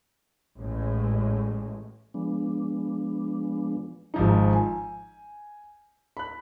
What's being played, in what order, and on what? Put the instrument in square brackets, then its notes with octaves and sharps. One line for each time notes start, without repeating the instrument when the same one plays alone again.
[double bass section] A1 A2 G#3
[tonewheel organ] F3 G#3 B3 D4
[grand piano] G#1 F3 D#4
G#5
B5 F#6